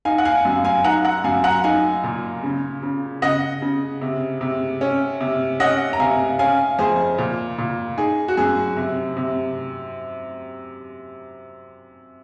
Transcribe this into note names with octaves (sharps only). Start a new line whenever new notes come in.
D#4 F5 G#5
F#5
F5 G#5
F#2
F5 G#5
D#4 F#5 A#5
F#5 A#5
F#2 F5 G#5
F#5 A#5
D#4 F5 G#5
A#2
C#3
C#3
C#3 D#5 F#5
C#3
C3
C3
C#4
C3
C#4 D#5 F#5
A#5
C3 F5 G#5
C#4 F5 G#5
F2 G#4 C5
A#2
A#2
D#4 G#4
F#4
F#2 G#4
C3
C3